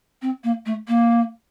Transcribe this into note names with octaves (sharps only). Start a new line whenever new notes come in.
C4
A#3
A3
A#3